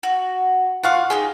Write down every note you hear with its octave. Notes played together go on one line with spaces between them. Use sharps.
F#4
F4 F5 F#5 C#6 D6
D#4 G4 G#4 G5